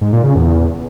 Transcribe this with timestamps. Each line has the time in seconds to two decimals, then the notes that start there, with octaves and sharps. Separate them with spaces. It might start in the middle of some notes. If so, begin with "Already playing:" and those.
0.01 G#2
0.13 A#2
0.24 C#3
0.35 E2
0.47 E2